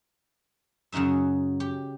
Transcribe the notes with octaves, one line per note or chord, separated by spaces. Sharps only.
F#2 C#3 F#3 D#4 E5
G4